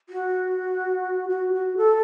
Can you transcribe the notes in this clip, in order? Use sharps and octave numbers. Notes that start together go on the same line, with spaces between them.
F#4
F#4
F#4
A4